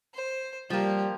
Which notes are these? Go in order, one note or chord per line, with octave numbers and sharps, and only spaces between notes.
C5
F3 G3 A#3 G4